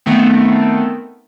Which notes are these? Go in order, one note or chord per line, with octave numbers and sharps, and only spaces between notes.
D#3 A3 B3 C4